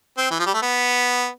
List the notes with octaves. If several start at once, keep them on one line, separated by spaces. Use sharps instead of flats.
C4
E3
F3
G3
A3
B3